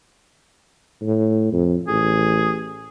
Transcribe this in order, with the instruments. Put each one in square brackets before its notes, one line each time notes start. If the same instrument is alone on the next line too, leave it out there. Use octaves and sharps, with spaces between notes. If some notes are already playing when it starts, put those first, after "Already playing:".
[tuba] A2
F2
[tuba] A1 [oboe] G#4